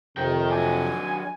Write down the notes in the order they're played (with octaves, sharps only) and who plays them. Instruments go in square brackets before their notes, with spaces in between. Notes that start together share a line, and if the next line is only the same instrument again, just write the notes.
[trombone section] F2 C3 [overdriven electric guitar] A#4 G5
[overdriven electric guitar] F#3 D4 [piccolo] G#5